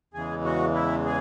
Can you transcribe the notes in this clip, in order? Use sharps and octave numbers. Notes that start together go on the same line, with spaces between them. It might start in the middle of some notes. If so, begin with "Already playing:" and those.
E2 C#3 E3 G#3 G#4
F#4
E4
G#4